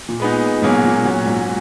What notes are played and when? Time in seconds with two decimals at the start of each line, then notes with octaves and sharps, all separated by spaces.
0.08 A#2
0.20 G#3 B3 D#4
0.62 G#2 B2 F#3 A#3 C#4 G#4
0.83 A#2
1.04 A#2 F#3 C#4 F#4
1.26 G#2